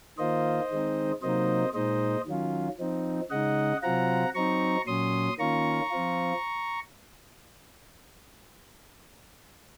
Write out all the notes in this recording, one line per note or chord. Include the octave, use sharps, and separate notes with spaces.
D#3 A#3 F4 C5 D#5
D#3 G#3 C4 D#4
C3 F#3 A#3 D#4 C5 D#5
A#2 G#3 D#4 C5 D#5
D#3 F#3 C#4 F4
F3 C4 D#4
C#3 G#3 D#4 D#5 F#5
C3 F#3 C4 F4 F#5 A#5
F#3 C4 D#4 A#5 C#6
A#2 F#3 C#4 C6 D#6
D#3 A#3 C#4 F4 A#5 C#6
F3 C4 F4